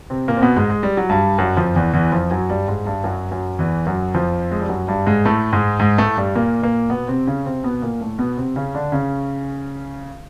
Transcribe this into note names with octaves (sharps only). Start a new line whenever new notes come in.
C3 C4
A#2 A#3
C4
B2 B3
G#2 G#3
G#3
G3
F#3
G2 G3
F#2 F#3
F2 F3
E2 E3
E2 E3
F2 F3
F#2 F#3
G2 G3
G#2 G#3
G2 G3
F#2 F#3
F#2 F#3
E2 E3
F#2 F#3
F2 F3
G#3
G3
F#2 F#3
G2 G3
G#2 G#3
A2 A3
G#2 G#3
G#2 G#3
A2 A3
G2 G3
A#2 A#3
A#2 A#3
B2 B3
C3 C4
C#3 C#4
C3 C4
B2 B3
A#2 A#3
A2 A3
B2 B3
C3 C4
C#3 C#4
D3 D4
C#3 C#4